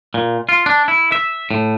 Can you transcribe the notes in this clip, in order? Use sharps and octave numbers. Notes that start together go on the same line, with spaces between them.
A#2
F4
D4
E4
E5
A2